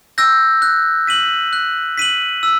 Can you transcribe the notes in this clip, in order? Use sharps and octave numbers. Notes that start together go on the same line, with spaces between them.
E6 G6 A#6
F#6
B6 D#7 F#7
F#6
B6 D#7 F#7
E6